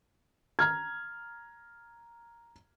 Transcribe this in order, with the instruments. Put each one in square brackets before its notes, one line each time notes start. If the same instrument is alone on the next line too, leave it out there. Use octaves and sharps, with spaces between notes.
[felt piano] A#5 F6 G#6